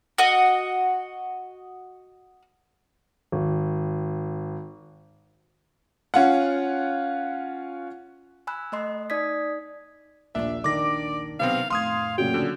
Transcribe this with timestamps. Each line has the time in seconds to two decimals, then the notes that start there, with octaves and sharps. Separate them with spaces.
0.18 F#4 D#5
3.32 G#1
6.14 C#4 F4 F#5
8.47 G#5 B5 E6 F#6
8.72 A3 D#5 C6
9.10 D#4 D5 D#6 G#6 B6
10.35 A#1 D#2 A#2 D4 E5
10.64 D#3 D4 D5 D6 A#6
11.40 B1 C3 B3 C4 F5
11.70 F2 A2 F5 C6 D#6 G#6
12.18 A#2 C#3 F#3 G5
12.34 D3